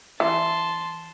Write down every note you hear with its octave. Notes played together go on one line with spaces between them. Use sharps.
E3 A5 C6